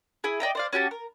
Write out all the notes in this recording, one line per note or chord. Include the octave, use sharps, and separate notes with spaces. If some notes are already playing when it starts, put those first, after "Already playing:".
E4 G#4
D5 D#5 G5 A#5
C5 D5 F5
C#4 F#4 G4 A5
A#4